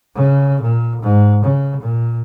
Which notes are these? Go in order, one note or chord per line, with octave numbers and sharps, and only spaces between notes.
C#3
A#2
G#2
C#3
A#2